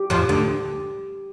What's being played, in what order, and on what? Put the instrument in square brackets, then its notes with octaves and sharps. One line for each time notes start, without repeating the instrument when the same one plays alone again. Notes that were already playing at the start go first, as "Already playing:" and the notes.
Already playing: [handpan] G4
[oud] F2 F3
D2 D3